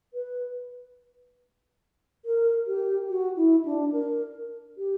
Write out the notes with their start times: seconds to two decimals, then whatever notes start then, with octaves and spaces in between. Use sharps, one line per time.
0.14 B4
2.25 A#4
2.67 G4
3.09 F#4
3.36 E4
3.65 D4
3.92 A#4
4.78 G4